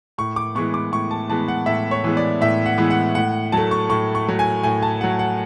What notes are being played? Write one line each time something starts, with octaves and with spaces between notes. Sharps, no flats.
A2 C#6
D6
E3 G#3 B3 C#6
D6
A2 C#6
A5
E3 G#3 B3 A5
F#5
A2 E5
C#5
E3 G#3 B3
D5
A2 E5
F#5
E3 G#3 B3
F#5
A2 F#5
F#3 A3 A5
C#6
A2 C#6
C#6
F#3 A3
G#5
A2 G#5
A5
F#3 A3 F#5
F#5